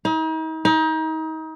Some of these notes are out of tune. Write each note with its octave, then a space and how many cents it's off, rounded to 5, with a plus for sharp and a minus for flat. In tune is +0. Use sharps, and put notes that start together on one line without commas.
D#4 +40
D#4 +30